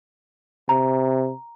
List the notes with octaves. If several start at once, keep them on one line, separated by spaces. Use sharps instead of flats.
C3 A#5